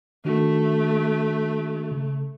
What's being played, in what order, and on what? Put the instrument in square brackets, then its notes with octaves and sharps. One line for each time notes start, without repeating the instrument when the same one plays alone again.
[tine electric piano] D#3 D4 F#4 [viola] A3
[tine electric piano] C#3